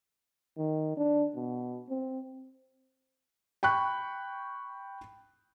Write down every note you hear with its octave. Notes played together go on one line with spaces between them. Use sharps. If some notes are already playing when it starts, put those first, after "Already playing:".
D#3
D4
B2
C4
G5 B5 C#6 F#6